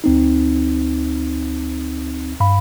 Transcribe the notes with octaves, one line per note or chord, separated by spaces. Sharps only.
D2 C4 D#4
G2 F5 B5